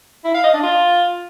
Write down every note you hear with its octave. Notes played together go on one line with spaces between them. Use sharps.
E4
F5
D#5
D4
F4